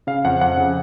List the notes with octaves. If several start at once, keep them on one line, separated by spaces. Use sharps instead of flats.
C#3 F5
F2 F#5
F2 F#5
C#3